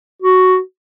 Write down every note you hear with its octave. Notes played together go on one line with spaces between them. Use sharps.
F#4